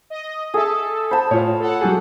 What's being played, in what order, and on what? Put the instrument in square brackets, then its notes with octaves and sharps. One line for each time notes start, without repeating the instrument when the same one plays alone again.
[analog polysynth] D#5
[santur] G#4 E5 [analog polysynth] A4
[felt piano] C5 [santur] A5 B5
[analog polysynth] A2 [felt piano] F4 C#5
[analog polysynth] A4 F#5
[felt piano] F#3 G4 G#4